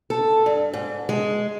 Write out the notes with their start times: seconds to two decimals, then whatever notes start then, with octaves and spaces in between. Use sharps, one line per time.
0.10 A4
0.46 G2
0.73 G#2
1.09 G#3